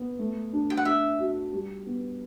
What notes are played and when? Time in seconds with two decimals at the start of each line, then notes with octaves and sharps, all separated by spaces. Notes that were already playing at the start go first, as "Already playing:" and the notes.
Already playing: B3
0.19 A3
0.53 D4
0.70 G5
0.77 F#5
0.85 D4 E5
1.19 F#4
1.53 G3
1.86 B3